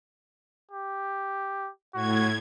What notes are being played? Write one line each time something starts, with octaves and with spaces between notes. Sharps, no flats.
G4
A2 F#4 G#6